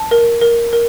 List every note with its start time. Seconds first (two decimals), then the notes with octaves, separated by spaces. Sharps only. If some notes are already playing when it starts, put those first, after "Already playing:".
Already playing: A5
0.11 A#4
0.41 A#4
0.73 A#4